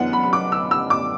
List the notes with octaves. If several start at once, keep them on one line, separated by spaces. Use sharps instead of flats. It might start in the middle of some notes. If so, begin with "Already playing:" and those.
Already playing: F#2 E3 B3 D4 F#5
B5
B5
D6
E6
E6
D6